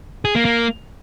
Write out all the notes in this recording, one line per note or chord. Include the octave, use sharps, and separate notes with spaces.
G#4
A#3
A#3